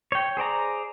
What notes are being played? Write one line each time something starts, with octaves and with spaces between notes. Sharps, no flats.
C#5 G5
G#4 C5 D5 A#5